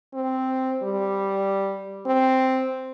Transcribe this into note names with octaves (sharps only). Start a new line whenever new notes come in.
C4
G3
C4